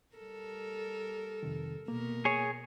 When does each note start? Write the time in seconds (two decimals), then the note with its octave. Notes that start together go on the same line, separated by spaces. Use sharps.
0.15 G3 A4 A#4
1.43 F2 C3 D#3
1.88 B2 A#3 A#4
2.25 G#4 C#5